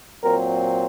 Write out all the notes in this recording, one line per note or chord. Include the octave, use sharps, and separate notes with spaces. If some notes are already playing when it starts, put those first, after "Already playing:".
A#2 F#3 C4 A#4